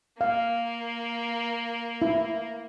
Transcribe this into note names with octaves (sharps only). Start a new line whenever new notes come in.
A#3 F5
E4